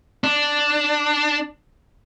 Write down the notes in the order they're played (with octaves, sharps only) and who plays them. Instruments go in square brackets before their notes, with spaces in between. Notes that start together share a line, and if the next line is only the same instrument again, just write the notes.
[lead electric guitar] D4